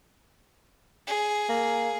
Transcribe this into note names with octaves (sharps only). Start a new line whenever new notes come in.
G#4
A#3